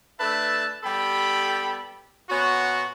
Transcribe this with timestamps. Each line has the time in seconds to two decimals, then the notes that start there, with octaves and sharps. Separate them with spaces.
0.19 A3 D4 A4 B4 E5 A5
0.83 G3 B3 G4 A4 G5 B5
2.30 A#2 B3 C#4 F#4